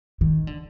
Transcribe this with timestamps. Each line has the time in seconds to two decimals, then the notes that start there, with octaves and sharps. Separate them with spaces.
0.21 D#3
0.47 D3